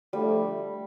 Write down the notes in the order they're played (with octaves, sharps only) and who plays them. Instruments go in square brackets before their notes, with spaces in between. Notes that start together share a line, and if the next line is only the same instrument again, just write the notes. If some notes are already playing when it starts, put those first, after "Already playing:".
[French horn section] D3 F3 A3 [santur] G3